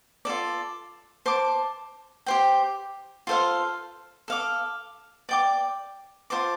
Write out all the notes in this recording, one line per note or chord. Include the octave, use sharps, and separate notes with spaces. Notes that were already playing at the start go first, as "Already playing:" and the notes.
F4 A4 D5
C5 A5 D6
G4 C5 G5
F4 A4 C5 F5
A4 F5 D6
D5 G5 D6
F4 C5 A5 D6